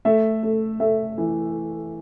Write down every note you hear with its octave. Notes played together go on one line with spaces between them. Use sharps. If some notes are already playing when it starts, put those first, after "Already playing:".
A3 E5
A3
A3 E5
E3